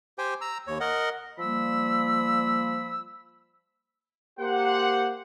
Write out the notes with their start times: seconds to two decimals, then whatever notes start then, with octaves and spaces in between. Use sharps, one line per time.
0.18 G4 C5 G5 G#5
0.41 A#5 E6
0.67 D#2 C#5
0.80 A#4 D#5 F#5
1.39 F3 G3 A#3 B5 E6
4.40 A#3 G4 C5 F#5